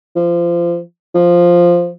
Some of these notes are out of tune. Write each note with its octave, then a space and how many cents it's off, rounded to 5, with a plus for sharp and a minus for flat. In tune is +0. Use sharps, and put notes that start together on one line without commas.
F3 -25
F3 +0